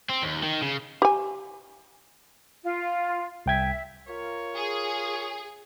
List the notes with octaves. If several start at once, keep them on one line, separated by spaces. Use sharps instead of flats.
C4
D#2
D#3
C#3
G4 G#5
F4
C2 E5 G5 G#6
F4 A#4 C#5
G#4